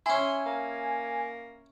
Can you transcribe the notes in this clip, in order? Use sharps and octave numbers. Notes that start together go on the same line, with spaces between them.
C#4 E4 G#5 C6
A#3